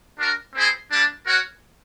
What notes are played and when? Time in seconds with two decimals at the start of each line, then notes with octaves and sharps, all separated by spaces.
0.18 D4 F#4 A#4
0.55 C4 E4 G#4 C5
0.90 G3 A#3 D4
1.26 F#4 A#4 C#5 F#5